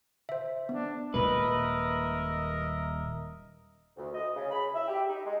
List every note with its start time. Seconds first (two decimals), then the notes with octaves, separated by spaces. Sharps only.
0.29 C5 E5
0.69 B3 D4
1.14 D#1 A#2 G#3 A#4 B4 D#5 E5
3.97 D2
4.15 D#5
4.35 C#3
4.51 B5
4.74 E5
4.88 G4
5.09 D#4
5.25 G#3